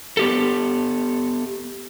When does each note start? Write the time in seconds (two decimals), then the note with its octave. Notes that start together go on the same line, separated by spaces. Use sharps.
0.17 B3 G4 A4